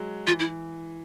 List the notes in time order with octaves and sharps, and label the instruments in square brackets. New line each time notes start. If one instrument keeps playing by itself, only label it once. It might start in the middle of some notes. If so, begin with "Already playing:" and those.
Already playing: [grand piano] F#3 G#3
[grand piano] E3 [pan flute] F4
[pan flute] E4